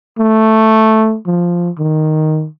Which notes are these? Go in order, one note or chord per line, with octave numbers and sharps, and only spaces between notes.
A3
F3
D#3